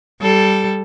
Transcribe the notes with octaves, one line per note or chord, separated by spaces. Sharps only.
G3 A4